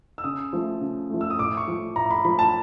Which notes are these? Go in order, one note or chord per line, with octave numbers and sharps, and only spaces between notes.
E6
C#3 D#6
F3 A3
C#3
F3 A3
E6
D#6
A2 D6
C#6
F3 A3
A2 A#5
B5
F3 A3 B5
A5